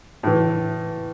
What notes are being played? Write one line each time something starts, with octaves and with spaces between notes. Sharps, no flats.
A2 E3